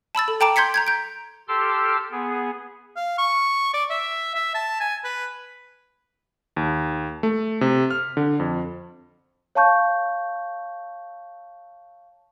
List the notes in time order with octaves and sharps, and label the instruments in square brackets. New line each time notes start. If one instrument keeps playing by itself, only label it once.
[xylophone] A5 B5 E6 A6
A4
A4 G5 A5 A#5 D6 D7
C6 G6 G#6 B6 C#7
A#5 G6 G#6
G6 D7
[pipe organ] G4 A4 C6 D6 E6 F6
B3 G#4
[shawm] F5
C#6
D5
E5
E5
A5
G#5
B4
[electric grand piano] D#2
A3
C3
F6
D3
F2
[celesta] C#5 F5 A5 C#6 G6